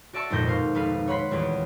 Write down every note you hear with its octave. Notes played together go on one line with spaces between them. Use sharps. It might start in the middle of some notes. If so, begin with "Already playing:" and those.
F#4 D5 E5 A5 C#6 E6
G#1 F2 A#2 D#4 G6 A#6
B2 F5 C6
F1 B4 F5
C#5 F#5 B5 C6 B6
D#1 E2 G4 B4